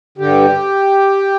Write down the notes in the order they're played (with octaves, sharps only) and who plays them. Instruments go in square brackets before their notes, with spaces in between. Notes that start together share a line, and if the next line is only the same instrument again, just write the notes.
[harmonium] G2 D3 G4